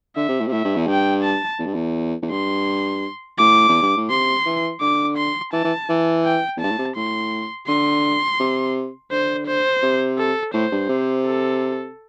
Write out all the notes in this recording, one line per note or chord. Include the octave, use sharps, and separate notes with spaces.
D3 E5
C3
A2
C3
A2 E5
G2
E2
G2 G5
A5
E2
G2
E2
E2
G2 C6
A2 D6
E2
G2
A2
C3 C6
E3
D3 D6
C6
E3 A5
E3
E3
G5
E2
G2 A5
A2
C3
A2 C6
D3 C6
C3
D3 C5
C5
C3
A4
A2 C5
G2
C3
A4